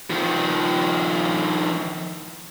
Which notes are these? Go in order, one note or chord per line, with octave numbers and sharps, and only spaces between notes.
D#3 F3